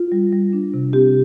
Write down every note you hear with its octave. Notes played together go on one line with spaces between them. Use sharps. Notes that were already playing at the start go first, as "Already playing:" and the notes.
Already playing: F4
G3
G3
D4
C3
C4 G4